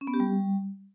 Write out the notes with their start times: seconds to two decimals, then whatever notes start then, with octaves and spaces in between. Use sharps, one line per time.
0.01 C#4
0.07 B3
0.14 G4
0.20 G3